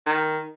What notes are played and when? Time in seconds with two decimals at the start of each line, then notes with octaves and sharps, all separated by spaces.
0.06 D#3